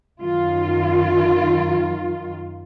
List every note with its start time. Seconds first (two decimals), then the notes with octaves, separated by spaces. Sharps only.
0.22 F#2 D#3 F4